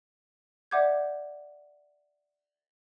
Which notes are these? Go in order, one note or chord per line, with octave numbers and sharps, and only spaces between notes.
D5 E5 F#5 D6 G6 G#6